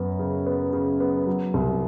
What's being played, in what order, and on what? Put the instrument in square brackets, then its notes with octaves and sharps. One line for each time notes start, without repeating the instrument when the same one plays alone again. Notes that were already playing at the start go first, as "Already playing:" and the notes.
Already playing: [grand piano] F#2 B3
C#3
B3
C#3
B3
F#3
C2